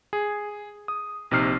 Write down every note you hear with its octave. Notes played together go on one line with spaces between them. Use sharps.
G#4
D#6
A#1 C3 D#4 F6 C7